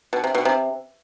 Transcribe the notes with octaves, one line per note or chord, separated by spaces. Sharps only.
B2
C3
B2
C3